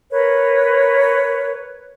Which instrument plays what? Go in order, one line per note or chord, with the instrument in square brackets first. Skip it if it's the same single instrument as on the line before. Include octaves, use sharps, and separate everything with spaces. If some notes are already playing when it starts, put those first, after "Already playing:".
[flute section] A#4 B4 C#5